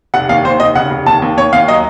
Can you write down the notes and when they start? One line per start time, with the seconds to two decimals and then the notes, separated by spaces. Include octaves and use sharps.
0.14 F1 F#5
0.29 D#2 F5
0.45 D#2 C5
0.60 F1 D#5
0.75 C#3 F#5
0.91 F1
1.06 D#2 A5
1.22 D#2
1.37 D#2 C#5
1.53 D#2 F5
1.68 F#3 D#5